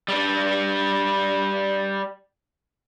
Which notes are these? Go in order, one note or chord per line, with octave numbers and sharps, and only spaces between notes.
G3 D4